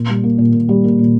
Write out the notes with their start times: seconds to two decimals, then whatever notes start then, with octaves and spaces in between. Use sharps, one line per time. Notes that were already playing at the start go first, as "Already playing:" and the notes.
Already playing: A#2
0.09 G3
0.24 A#3
0.38 A#2
0.53 A#2
0.69 G3
0.84 A#3
0.99 A#2